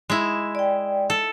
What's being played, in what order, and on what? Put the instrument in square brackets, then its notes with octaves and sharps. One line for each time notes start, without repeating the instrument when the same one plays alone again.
[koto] G#3 E4
[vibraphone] D5 G5
[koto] A4